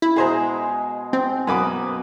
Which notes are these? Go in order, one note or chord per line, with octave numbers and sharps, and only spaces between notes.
E4
B2 G#3 G#4 C5 A#5
C4
F#2 B2 A#3 B3 B4 D6